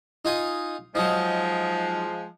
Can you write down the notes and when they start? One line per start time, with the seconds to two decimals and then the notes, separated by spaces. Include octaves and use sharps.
0.25 D#4 F4 G#5
0.95 F3 F#3 G#3 D#4